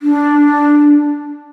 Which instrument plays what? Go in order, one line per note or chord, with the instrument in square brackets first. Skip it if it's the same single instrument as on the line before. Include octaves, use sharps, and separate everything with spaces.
[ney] D4